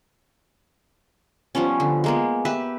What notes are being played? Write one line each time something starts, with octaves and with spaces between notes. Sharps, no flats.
F3 G3 B3 C#4
D3
G#3 A#3 B3
G4 B4 E5